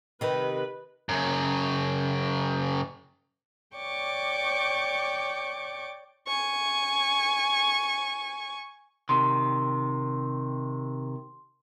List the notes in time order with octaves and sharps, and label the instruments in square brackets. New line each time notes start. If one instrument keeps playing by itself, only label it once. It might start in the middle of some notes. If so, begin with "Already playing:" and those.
[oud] C3 D#3 [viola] B4
[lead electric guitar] F#2 C#3
[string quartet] C#5 D5 G5 C#6 D6
[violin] G#5 C#6
[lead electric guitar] C3 D#3 [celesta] C6